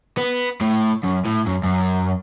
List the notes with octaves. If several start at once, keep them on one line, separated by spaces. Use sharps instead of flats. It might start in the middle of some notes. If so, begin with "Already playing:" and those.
B3
A2
F#2
A2
F#2
F#2